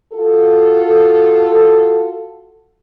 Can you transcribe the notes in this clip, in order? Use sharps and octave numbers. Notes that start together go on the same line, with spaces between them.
F4 F#4 A4